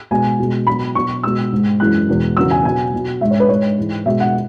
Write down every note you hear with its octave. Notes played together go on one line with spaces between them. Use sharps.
B2 G#3 G#5
B2 G#3
B2 F#3 B5
B2 F#3 C#6
B2 G#3 E6
G#2 G#3
F#2 E3 G#3 F#6
E2 B2 G#3
E2 C#3 F#3 E6
G#5
B2 F#3 G#5
B2 F#3
G#2 G#3 E5
C#5
B4
G#2 G#3 C#5
G#2 E3 G#3
B2 G#3 E5
F#5